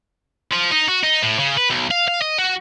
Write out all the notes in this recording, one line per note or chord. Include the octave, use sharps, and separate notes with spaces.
F3
D#4
F#4
D#4
A2
C#3
B4
B1
F5
F5
D#5
F#4